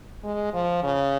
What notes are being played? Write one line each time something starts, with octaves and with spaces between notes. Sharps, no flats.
G#3
F3
C#3